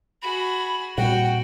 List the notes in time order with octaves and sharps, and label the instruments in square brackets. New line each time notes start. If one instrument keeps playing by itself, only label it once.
[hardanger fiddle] F#4 G#4 [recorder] B5
[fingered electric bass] A#2 G3 C4 [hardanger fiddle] F#4 [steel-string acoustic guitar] F#5 [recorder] G5